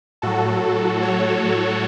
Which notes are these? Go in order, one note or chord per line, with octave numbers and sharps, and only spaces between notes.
A2 F#3 F#4 A4
A4 C#5